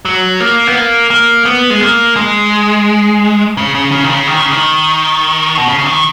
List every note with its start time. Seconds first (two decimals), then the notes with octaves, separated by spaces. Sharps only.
0.05 F#3
0.40 A#3
0.67 B3
0.75 A#3
1.10 A#3
1.45 B3
1.70 G#3
1.81 A#3
2.16 G#3
3.57 C#3
3.75 C#3
3.92 C#3
4.04 D#3
4.10 C#3
4.27 D#3
4.40 C#3
4.51 D#3
5.58 B2
5.68 C#3
5.79 C#3
5.86 D#3